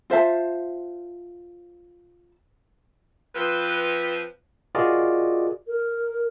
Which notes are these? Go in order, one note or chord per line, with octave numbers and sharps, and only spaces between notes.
F4 C5 E5 A5
F3 C4 B4
F4 F#4 G#4 A#4 D5 D#5
A#4